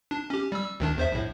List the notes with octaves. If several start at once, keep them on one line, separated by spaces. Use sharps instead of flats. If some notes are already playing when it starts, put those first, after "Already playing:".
D4
C#4 G4
G3 E6
D2 D#3 D4
E2 C5 E5
A#1 A2